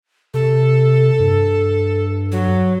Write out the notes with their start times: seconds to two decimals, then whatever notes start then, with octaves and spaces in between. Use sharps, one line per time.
0.34 C3 A4
1.20 G2
2.32 F#3